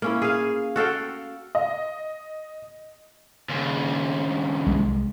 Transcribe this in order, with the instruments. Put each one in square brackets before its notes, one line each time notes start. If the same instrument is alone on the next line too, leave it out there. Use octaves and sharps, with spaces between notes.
[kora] A#3 C#4 E4
G#4 F5
F#4 A4 F5 G5
[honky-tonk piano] D#5
[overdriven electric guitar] D#2 C#3
[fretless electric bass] C2 G#3